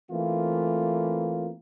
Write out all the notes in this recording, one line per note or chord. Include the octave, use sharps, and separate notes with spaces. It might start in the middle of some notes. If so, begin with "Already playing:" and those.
E3 A3 A#3 C4 F4